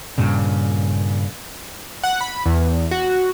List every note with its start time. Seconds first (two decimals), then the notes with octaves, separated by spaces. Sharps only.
0.18 G2 A#2 C#3
2.04 F#5
2.21 B5
2.46 E2
2.91 F#4